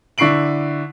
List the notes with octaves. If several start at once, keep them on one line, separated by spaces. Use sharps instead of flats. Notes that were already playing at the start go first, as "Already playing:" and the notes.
D3 E4 C#6 C7 D7 F#7